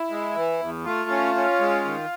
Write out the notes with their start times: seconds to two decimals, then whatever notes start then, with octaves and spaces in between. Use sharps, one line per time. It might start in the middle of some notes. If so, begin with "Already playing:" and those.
Already playing: E4
0.10 G#3
0.35 E3
0.60 E2
0.85 A3 F4
1.10 C#4
1.35 C#4
1.60 G#3
1.85 D#3